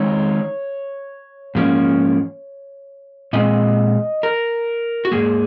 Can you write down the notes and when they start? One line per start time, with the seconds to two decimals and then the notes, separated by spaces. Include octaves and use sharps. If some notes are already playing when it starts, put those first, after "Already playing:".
Already playing: D#3 G#3 C4 D#4 C#5
1.55 G#2 F3 A#3 C#4
3.33 A#2 G#3 C4 D#5
4.23 A#4
5.05 F#4
5.12 G#2 D#3 A#3 G#4